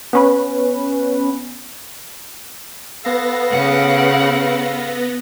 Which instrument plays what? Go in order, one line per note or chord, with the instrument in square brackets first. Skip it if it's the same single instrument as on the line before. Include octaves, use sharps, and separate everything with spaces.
[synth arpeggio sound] B3 C#4 B4
[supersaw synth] B3 A#6 [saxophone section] A4 C5 F5
[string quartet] C#3 C#5 F#5